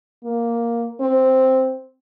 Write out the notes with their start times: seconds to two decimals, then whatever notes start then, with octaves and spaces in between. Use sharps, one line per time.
0.25 A#3
1.01 C4